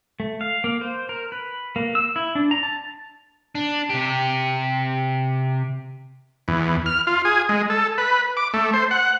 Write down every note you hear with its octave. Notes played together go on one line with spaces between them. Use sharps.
A3
F5
A#3
C5
A#4
B4
A#3
E6
E4
D4
A#5
A5
D4
C3 G4
E2
F6
F4
G#4
G#3
A4
B4
D6
A3
C5
F#5